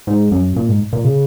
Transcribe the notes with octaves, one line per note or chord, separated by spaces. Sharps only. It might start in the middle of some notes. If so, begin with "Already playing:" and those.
G#2
F#2
A#2
G#2
A#2
C#3